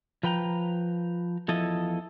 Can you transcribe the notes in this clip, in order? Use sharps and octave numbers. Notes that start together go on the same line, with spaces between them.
F3 B4 G5 A#5
E2 F3 E4 A4 D#5